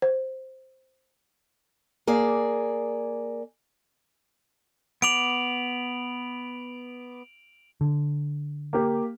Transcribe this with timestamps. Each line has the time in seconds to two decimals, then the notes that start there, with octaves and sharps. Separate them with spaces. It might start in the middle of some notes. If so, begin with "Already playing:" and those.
0.02 C5
2.07 A#3 G#4 D5
5.02 B3 D6 D7 F7 F#7
7.81 D3
8.73 A#3 G4